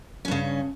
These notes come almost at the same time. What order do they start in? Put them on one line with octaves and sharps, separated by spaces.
C#4 G2 C#3